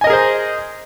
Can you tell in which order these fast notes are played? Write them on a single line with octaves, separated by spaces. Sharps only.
G#5 D#5 A#4 G#4 C5